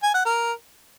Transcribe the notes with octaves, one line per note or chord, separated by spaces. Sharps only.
G#5
F#5
A#4